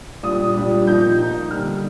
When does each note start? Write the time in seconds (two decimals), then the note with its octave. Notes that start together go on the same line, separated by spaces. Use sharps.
0.23 A#2 G3 D4 D#6
0.54 A#2 G3 D4
0.87 A#2 F3 A#3 D#4 G6
1.18 A#2 F3 A#3 D#4
1.51 D3 G3 A#3 D#4 F6